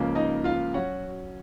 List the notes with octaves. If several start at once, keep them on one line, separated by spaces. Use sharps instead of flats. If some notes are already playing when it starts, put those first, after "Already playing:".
Already playing: C#2 C#3 F3 A#3
D#4 D#5
F4 F5
F#3 C#4 F#4 F#5